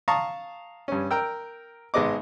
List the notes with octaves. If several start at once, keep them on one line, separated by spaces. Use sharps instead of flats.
F5 A5 A#5 C#6 D#6
G2 C#4
A#4 G5 E6
G#1 G#3 B3 D#5 D6